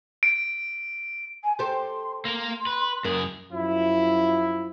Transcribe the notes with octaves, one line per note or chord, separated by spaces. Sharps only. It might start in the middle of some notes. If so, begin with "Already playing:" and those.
D7
G#5
G4 A4 C5 C6
A#3 A#4 C6
B4
F#2 G#4 A#4
F#2 F3 E4